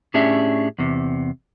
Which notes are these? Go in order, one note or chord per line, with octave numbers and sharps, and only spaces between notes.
A2 C#4 D4 G4 G#4 E5
E2 C3